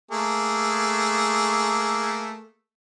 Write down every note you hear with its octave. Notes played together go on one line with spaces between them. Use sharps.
A3 A#3 G#4